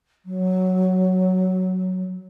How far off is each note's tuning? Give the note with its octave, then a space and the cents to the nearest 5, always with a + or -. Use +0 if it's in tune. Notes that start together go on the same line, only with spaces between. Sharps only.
F#3 +0